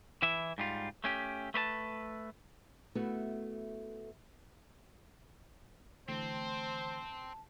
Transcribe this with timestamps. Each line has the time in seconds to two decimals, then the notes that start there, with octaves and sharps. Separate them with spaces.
0.22 E3 E4 E5
0.58 G#2 G3 F4
1.04 A3 C#4 G4
1.54 A3 B4 C#5 A5
2.95 A3 B3 E4 F#4
6.09 D3 E3 A3 C4 C5 A5